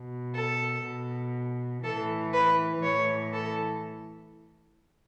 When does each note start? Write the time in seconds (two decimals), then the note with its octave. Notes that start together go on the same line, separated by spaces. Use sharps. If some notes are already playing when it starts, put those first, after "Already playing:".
Already playing: B2
0.35 A4
0.86 B2
1.84 A2 E3 A4
2.34 B4
2.83 A2 E3 C#5
3.33 A4